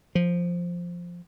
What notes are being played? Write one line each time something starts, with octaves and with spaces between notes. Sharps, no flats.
F3